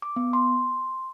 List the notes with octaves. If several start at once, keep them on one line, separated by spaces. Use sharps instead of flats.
D6
B3
C6